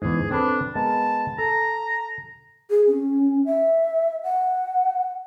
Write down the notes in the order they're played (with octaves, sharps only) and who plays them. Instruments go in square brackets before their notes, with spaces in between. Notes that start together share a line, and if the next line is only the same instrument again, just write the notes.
[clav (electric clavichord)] E2 G#2 [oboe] G#4
[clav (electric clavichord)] C4 A4 B4 [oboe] D4
[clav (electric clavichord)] G#3 B3 A#4 [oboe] A5
[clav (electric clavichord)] A4 [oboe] A#5
[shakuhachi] G#4
C#4
E5
F#5